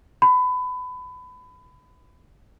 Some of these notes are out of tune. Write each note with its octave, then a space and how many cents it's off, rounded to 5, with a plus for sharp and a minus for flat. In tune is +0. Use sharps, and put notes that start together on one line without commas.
B5 +25